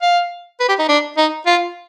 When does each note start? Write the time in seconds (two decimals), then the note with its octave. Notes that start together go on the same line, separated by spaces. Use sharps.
0.02 F5
0.60 B4
0.69 G4
0.79 D#4
0.89 D4
1.17 D#4
1.46 F4